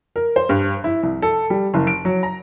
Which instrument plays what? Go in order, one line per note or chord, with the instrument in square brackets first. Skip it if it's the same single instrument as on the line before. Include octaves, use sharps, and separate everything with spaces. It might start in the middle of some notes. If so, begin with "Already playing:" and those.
[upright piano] A#4
C5
G2
E4
C2
A4
G3
F#1
D7
F#3
A#5